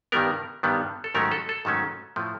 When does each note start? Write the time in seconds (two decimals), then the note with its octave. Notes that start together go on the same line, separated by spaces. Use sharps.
0.12 G2 D#3 G3 B3 A#4
0.63 G2 D#3 G3 B3
1.04 A4
1.14 G#2 D#3 F#3 A3 C#4 A#4
1.31 A4
1.49 A4
1.65 G#2 D#3 F#3 A3 C#4
2.16 A2 F3 A3